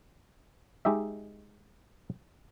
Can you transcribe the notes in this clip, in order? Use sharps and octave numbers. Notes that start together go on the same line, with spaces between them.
G#3 D#4 G4 D#5 E5